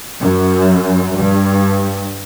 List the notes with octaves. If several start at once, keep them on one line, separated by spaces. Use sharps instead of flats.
F#2
G2